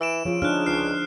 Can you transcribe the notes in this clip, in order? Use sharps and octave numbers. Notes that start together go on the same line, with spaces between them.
E3 E6 D7 E7
C#3 F3 F4
C#3 D4 D#4 G#4 F6 F#6
C#2 F6 C7